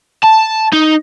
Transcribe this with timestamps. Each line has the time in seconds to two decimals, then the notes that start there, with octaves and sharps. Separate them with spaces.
0.24 A5
0.73 D#4